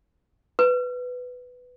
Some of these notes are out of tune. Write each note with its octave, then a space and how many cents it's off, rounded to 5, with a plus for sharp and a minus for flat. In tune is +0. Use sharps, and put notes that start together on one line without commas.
B4 +10